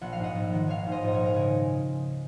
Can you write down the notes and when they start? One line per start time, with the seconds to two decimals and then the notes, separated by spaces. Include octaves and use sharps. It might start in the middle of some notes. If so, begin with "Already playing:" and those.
0.01 A#1 F#5
0.13 F5
0.18 G#2
0.23 D#5 F#5
0.35 A#1
0.53 D#3
0.68 A#1 C#5 F5
0.86 G#2
0.92 C5 D#5
1.03 A#1 D#5
1.14 A#4 C#5
1.20 G#2
1.25 A#4
1.34 C#3 G#4